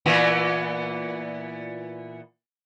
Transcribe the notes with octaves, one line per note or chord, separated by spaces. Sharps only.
A#2 E3 B3